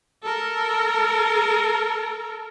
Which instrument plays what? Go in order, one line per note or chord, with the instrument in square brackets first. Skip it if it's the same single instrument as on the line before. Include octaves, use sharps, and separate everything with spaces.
[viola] A4 A#4